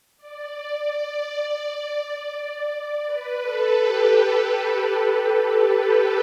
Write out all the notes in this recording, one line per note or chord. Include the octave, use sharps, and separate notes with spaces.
D5
B4
A4
G4